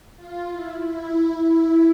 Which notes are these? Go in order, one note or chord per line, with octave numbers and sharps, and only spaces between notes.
F4
E4
E4
E4